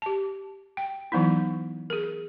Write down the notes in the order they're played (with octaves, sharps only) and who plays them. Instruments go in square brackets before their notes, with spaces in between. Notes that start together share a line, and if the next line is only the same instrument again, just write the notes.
[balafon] G4 A5
G5
E3 F#3 B3 D#4 E4
G#4 A#4